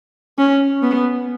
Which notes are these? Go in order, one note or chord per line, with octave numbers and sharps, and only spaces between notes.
C#4
B3